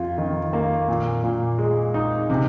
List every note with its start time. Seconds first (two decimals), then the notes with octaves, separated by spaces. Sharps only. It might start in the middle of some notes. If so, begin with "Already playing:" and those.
Already playing: F2 F4
0.18 D#3
0.53 A#3
0.88 A#2
1.23 A#2
1.58 G#3
1.94 D#4
2.30 C3